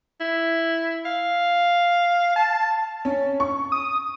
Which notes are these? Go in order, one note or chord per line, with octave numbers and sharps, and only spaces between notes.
E4
F5
A5
C#4
C#6
D#6